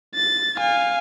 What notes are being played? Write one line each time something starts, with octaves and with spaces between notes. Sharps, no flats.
A6
F5 G#5